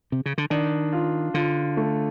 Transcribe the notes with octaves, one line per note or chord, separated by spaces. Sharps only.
C3
C#3
D3
D#3 D4
F4
D3 F4
A3